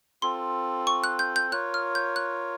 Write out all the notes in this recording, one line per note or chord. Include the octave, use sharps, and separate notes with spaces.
C4 F4 A4 C6
C#6
F#6
G6
G6
F4 A#4 C#5 F#6
F6
G6
F#6